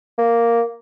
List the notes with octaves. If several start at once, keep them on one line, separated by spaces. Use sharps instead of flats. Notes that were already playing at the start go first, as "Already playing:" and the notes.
A#3